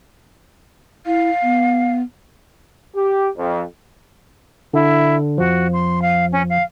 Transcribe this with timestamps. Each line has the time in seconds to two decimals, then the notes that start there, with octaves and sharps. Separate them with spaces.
1.06 E4 F5
1.43 B3
2.96 G4
3.36 F2
4.74 D3 E4
5.38 F2 F3 F#4
5.73 C6
6.02 F5
6.32 C#4
6.50 F5